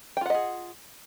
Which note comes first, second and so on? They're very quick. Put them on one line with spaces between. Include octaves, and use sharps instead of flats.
G5 F4 F#5 D#5 G#4